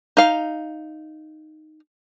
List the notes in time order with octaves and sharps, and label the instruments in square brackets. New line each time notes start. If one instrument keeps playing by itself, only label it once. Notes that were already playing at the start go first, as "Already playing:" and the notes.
[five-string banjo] D#4 F5